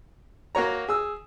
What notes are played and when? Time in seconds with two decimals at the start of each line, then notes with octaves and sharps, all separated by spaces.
0.55 A#3 F#4 C#5 A#5
0.89 G#4 E6